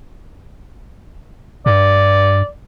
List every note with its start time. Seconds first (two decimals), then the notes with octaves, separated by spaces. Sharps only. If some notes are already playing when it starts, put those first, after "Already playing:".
1.66 G2 D5